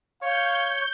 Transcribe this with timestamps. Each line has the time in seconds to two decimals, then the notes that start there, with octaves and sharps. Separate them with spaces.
0.22 C#5 F5 C#6 G6